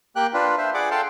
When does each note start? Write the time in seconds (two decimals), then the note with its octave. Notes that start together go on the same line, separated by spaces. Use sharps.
0.16 A#3 G4 G5 F#6
0.34 D4 F4 B4
0.58 C5 E5
0.74 G#4 D5 F#5 D6
0.91 A4 F5 G5 A5 C6